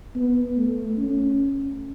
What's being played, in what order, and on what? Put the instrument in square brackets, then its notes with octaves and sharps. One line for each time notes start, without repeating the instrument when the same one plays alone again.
[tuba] B3
A3
C#4